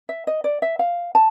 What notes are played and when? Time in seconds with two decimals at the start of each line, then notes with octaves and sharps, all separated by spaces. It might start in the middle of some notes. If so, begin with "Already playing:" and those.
0.09 E5
0.27 D#5
0.44 D5
0.62 E5
0.79 F5
1.15 A5